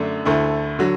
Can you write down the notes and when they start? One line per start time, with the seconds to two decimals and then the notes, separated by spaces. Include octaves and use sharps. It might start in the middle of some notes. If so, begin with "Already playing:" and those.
Already playing: F#2 D3 A3 D4
0.25 D2 D3 A3 E4
0.79 D3 F#3